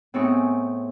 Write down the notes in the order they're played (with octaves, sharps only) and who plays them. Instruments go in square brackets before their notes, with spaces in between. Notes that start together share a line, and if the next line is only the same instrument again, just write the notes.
[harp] A2 B3 C4 D#4 G#4 C#6